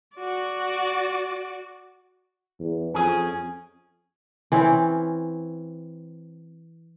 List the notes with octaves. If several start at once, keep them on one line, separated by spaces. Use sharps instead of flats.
F#4 D5
E2
F2 C#4 G#4
E3 C4 C#4